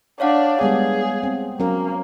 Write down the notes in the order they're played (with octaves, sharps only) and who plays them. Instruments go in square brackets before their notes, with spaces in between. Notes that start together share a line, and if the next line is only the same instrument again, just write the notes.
[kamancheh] D4 D5 [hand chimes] C#5 F5 F#5
[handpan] G3 G#3 B3 [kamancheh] G#4
[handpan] C4
[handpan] F#3 C#4 A#4 [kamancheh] A#3